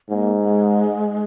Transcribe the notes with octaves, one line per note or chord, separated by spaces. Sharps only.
G#2 A#3
G#3